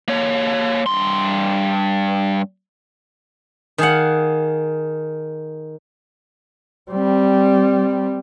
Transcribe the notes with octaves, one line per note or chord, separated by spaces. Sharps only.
A#3 C#5
G2 C6
D#3 G#4 F5 F#5
G3 C4